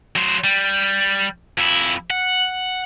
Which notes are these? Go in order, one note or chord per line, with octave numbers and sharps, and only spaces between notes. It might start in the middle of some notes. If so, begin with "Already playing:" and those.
F#3 C5
G3
F2 E4
F#5